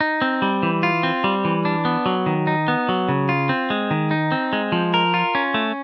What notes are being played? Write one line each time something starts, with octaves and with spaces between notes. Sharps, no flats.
D#4
C4
G3
E3
F4
C4
G3
E3
D4
B3
F#3
D#3
D#4
B3
F#3
C#3
F4
C4
G#3
D#3
D#4
C4
G#3
F3
A#4
F4
C#4
A3